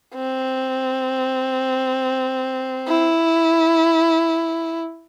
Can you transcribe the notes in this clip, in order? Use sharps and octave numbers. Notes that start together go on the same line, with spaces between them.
C4
E4